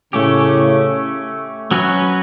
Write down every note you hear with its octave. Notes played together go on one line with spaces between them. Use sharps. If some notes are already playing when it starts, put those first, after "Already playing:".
A2 C#3 A3 C#4 G4
F#3 C#4 F#4 B4